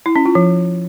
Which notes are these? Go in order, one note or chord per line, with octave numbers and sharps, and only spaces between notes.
E4
C#4
F4
F3